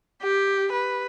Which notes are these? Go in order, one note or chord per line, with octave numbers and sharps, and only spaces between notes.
G4
B4